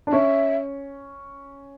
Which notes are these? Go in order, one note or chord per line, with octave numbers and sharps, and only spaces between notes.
D4
C#4 E5